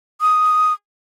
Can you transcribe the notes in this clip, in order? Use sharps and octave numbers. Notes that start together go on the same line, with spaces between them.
D#6